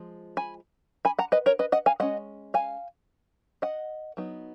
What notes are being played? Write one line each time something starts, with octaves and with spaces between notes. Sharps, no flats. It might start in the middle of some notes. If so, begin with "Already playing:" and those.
Already playing: F3 G#3
G#5 B5
G#5 B5
F#5 A#5
B4 D#5
A#4 C#5
B4 D#5
D#5 F#5
F5 G#5
G#3 C#4 D#5 F#5
F5 G#5
D#5 F#5
F#3 B3 D#4